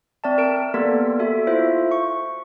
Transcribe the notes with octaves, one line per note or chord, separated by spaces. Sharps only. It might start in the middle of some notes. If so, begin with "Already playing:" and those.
C4 D5 E5 A5
A#4 D7
A#3 B3 G4 A4 A#4 D5
F#4 A4 E5
E4 F4 C5 E5
C#6